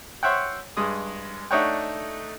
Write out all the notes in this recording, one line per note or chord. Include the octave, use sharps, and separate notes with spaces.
C5 C#5 E5 F#5 G5
G2 G#3 D#6
A3 D4 D#4 C#5 F#5 G5